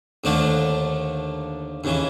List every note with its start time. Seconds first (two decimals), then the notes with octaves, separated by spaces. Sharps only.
0.24 D#2 D3 F3 A3 D4
1.84 D#2 C#3 E3